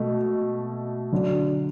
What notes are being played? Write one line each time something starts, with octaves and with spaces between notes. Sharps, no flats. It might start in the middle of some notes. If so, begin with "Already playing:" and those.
Already playing: B2 A3
D3 F#3 D4